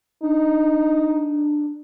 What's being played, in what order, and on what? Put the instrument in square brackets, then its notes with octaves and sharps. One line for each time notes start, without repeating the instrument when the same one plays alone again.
[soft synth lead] D4 [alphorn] D#4